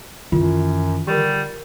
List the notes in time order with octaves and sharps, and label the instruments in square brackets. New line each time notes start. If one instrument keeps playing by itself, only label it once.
[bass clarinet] F#2 [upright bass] D#3 E3 [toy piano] F4
[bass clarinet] D3 [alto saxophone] G3 [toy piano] G4 A#4